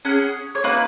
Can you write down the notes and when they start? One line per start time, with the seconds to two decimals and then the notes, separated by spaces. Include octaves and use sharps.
0.05 C#4 G#4 F#5
0.55 C#5
0.63 A#3 D#4 F#4 B4